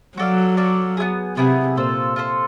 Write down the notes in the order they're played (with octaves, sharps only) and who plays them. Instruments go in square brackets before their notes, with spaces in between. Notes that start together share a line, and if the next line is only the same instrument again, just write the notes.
[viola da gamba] F#3 [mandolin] F#4 A4 D5 F5
[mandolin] F#4 A4 D5 F5
B3 E4 G#4
[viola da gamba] C3 [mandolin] B3 E4 G#4
[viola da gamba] A#2 [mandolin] F4 A4 C5
[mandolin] F4 A4 C5